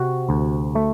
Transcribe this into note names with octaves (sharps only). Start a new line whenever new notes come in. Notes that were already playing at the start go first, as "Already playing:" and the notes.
Already playing: C3 F#4
D2
A3